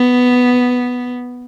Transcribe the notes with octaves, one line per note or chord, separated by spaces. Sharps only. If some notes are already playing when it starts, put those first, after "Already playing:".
Already playing: B3